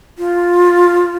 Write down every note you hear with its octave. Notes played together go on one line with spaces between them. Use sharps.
F4